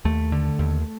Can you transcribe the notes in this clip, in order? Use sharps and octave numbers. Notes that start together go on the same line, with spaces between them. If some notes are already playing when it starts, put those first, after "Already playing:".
D#2 A3
D3
D#2